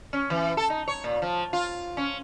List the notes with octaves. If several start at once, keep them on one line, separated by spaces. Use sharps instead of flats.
C#4
E3
A4
D#4
C#5
A#2
F3
F4
C#4